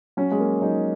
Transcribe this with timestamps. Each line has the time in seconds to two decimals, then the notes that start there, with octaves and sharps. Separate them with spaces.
0.17 F#3 C#4
0.31 G#3
0.40 A#3
0.62 F#3 D#4